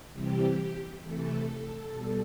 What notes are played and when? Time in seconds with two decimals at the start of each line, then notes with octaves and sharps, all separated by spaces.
0.14 C3 E3 G3 C4 G4
1.03 C3 E3 A3 A4
1.92 B2 G3